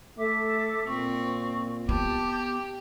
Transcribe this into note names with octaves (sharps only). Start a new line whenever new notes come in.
A3 A4 E5 D6
A#2 C4 C#6
B3 G4 A5 D6 G6